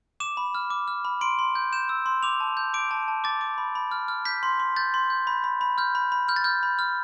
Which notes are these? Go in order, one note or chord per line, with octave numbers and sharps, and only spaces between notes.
D6 E7
B5
F6
D6
F6
B5
C6 D7
C6
G6
G6 E7
E6
C6
D6 F7
A5
G6
D6 D7
A5
A5
D6 A6
D6
B5
B5
F6
F6
G6 B6
C6
C6
G6 A6
C6
G6
B5
B5
B5
F6 G6
B5
B5
F6 G6
A6
F6 G6
B5
F6